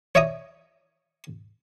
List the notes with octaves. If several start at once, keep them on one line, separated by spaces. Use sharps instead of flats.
C#5 D5 E5 A#5 D#6